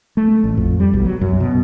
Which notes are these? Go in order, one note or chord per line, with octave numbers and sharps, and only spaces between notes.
A3
A1
F2
G3
B1
F#3
F#2
B2